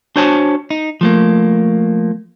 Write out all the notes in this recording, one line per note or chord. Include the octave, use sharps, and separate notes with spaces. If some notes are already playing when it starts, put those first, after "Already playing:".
D4 F#4 C5 C#5 G#5 A5
D#4
F3 A3 A#3